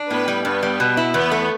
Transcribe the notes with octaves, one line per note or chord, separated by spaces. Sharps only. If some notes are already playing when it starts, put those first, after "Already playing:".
Already playing: D4
A2 B3 B4
G3
G2 B3 B4
G3
B2
E4
E2 B3 B4
A3